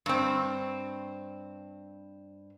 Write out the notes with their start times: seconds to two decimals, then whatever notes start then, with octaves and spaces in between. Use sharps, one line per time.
0.06 G2 C4